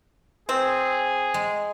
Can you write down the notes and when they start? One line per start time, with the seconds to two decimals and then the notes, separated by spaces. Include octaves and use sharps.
0.49 C4 G#4
1.34 G#3